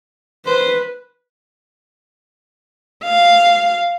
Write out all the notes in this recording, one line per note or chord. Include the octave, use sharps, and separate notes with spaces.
B4 C5
F5